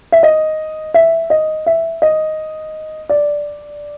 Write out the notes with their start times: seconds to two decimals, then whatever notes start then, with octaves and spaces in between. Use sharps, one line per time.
0.12 E5
0.23 D#5
0.94 E5
1.30 D#5
1.66 E5
2.02 D#5
3.09 D5